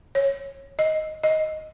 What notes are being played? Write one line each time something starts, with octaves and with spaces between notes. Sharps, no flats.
C#5
D#5
D#5